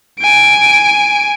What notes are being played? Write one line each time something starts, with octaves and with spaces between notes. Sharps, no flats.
G#5 D7